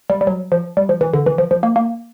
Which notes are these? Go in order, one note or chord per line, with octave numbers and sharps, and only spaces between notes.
G3
G3
F#3
F3
G3
F3
E3
D3
E3
F3
F3
A#3
A#3